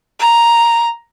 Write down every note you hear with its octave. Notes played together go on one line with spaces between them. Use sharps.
A#5